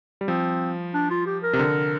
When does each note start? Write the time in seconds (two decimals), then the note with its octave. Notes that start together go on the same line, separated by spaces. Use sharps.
0.21 G3
0.27 F3 C4
0.94 D4
1.11 F4
1.26 G4
1.43 A#4
1.53 C3
1.59 D3